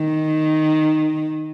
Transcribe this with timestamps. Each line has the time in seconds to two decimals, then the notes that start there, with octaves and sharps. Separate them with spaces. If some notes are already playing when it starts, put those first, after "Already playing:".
Already playing: D#3